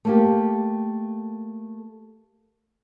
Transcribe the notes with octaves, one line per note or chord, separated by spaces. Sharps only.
A3 A#3 G4